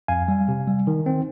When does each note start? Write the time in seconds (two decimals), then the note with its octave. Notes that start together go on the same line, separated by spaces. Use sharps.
0.08 F2 F5 G#5
0.28 G3
0.48 C3
0.68 G3
0.87 D#3
1.06 C4